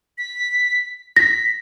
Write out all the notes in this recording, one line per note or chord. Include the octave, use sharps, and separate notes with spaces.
B6
A#6 B6